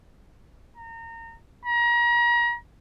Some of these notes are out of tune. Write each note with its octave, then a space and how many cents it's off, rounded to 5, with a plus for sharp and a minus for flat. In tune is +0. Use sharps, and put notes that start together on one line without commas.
A#5 -30
A#5 +35